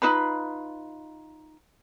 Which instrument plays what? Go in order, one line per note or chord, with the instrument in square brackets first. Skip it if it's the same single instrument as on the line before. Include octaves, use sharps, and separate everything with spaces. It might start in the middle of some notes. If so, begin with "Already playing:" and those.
[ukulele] D#4 F4 B4 B5